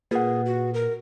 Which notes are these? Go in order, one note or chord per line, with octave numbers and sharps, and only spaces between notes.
A#2 G#4 B4 F#5
F#4
A#4